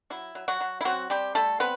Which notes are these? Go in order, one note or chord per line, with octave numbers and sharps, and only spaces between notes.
F#3 E4
F#3
F#3 F#4
F#3
E4
F#3 C4 F#4
G3 C4 G4
G3 A3 A4
B3 C4 B4